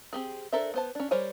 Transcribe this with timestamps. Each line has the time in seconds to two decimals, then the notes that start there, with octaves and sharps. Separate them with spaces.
0.13 C4 G4 G#4
0.52 D4 A4 A#4 C5 E5
0.74 B3 C5 A5
0.95 C#4 D4
1.11 G3 A#4 C5 C#5 G#5